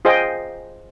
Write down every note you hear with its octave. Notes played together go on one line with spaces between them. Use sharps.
F4 G#4 C5 D#5 G5